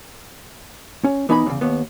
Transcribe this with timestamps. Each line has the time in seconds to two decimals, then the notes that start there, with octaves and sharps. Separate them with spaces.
1.04 C#4
1.29 E3 B3 D#4 G#5 A#5 B5
1.46 E2 C#3
1.61 D#2 B3